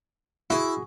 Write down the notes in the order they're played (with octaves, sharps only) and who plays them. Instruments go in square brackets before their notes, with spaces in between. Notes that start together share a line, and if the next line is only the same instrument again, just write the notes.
[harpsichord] E4 [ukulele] F#4 G#4